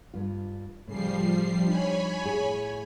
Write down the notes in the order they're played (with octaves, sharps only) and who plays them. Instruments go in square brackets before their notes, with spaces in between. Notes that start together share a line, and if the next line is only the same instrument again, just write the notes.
[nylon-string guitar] G2 F4
[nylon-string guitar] A2 C#3 [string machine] F3 G3 C7
[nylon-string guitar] D4 D#4 [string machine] C#5 G#5 B5
[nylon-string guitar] A2 G#4